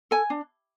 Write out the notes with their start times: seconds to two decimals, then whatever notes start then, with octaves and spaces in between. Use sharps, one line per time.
0.11 A4 G#5
0.30 D4